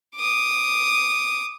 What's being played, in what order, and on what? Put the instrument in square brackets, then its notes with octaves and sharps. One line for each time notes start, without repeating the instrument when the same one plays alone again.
[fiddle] D6 D#6